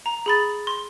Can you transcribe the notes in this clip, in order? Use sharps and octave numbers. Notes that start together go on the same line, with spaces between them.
A#5
G#4 B5 A6
C6